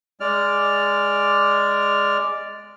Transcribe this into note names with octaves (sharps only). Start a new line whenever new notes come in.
G#3 D5 F6